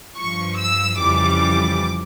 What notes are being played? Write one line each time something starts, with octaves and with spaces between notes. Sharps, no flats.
G2 F3 C#6
E6
F2 C#3 E3 G3 D6